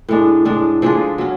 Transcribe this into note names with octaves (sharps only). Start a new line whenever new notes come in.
A2 G#3 D4
A2 G#3 D4
F3 G#3 D4 G#4
F#3 C#4